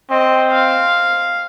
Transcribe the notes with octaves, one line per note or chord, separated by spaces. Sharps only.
C4 D#5
F5